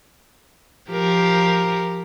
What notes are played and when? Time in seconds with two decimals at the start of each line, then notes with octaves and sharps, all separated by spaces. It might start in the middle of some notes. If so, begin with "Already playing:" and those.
0.90 F3 G4 A#4